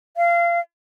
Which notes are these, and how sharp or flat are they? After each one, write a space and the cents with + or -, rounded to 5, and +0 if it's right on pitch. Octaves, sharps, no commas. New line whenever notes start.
F5 -25